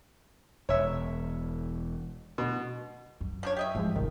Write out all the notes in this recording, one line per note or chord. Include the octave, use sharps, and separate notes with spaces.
E1 C#5 E5
B2
F#2
F3 D4 C#5
G4 D#5 E5
G#2 F3 G#3 A3
G#1 C3 D#3